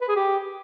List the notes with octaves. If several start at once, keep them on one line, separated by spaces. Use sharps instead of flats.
B4
G#4
G4